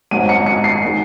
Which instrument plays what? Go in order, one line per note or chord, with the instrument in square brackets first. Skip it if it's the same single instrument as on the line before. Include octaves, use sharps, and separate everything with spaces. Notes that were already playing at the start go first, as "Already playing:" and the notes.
[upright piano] G#1 G#2 F#3 D#7
C#7
C#7
C7
D#3 G#3